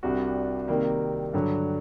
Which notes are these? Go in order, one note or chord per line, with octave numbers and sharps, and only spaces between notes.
C2 C3 G3 D4 F#4
C3 D#3 G3 A#3
G2 D3 F#3